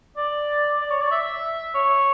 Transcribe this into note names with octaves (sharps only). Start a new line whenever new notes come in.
D5
D5
C#5
D5
E5
C#5